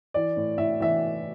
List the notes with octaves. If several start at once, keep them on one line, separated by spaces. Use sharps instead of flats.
E3 D5
A2
A2 E5
E3 E5